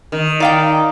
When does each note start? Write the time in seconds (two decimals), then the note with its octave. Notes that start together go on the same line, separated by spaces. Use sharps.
0.12 D#3
0.40 D#4 D5 F5 G5